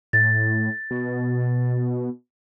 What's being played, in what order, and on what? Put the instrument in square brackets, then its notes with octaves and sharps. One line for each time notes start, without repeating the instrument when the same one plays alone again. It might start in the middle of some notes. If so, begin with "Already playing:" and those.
[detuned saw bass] A2 [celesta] A6
[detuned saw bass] B2